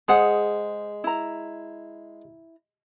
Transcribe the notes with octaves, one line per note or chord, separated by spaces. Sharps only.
G#3 G#4 C5 F#5
E4 A#5